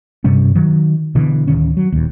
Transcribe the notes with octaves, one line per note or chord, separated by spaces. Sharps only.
G2 C3 G3 C#4
D#3 F#3
B2 D3 E3
D1 D#3 C#4
F#3
D#1 D#2